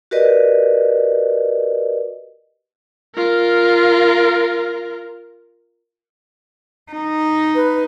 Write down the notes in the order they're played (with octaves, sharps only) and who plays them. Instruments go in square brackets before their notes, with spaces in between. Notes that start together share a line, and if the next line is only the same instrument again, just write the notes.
[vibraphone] F#4 G4 A#4 B4 D5 D#5
[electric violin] F4 A#4
[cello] D#4
[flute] B4